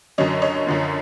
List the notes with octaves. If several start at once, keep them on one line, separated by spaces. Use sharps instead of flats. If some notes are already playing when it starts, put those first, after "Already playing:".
F#2 D3 F#3 C#5 D#5
C#5 D#5
F#2 D3 F3